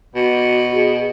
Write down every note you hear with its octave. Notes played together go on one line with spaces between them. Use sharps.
B2 F#4
G#4